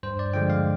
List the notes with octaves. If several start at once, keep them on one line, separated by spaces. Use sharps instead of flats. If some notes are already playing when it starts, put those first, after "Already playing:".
G2 C5
D5
D3 F3 G#3 G5
F5